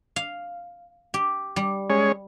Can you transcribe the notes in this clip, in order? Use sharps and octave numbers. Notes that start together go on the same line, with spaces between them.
F5
G4
G3
G#3 C#4 C#5